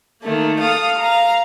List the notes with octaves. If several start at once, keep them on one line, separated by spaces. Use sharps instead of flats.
D#3 A3 A#3
A4 F5 D#6
F5 A#5